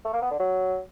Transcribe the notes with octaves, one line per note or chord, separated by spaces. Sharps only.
A3
A#3
B3
D3
F#3